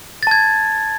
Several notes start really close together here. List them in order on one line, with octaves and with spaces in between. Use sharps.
A6 A5 G#6